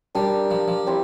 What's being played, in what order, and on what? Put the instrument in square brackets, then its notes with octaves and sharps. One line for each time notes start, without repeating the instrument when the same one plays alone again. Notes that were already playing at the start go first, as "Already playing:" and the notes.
[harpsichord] G3 [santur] D4 G4 A#4
[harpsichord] F3
F3
[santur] G3 C4 E4